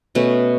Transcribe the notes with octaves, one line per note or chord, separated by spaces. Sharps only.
B2 A3 C#4